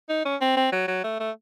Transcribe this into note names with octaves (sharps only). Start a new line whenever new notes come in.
D#4
C#4
C4
C4
F#3
F#3
A3
A3